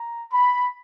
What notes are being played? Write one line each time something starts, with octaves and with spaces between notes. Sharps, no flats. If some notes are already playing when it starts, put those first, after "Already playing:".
Already playing: A#5
B5